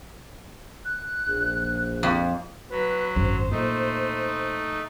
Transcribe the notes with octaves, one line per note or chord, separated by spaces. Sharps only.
F#6
A#1
F2
F#3 B4
G#1 F#2 C5
A#2 A3 D#4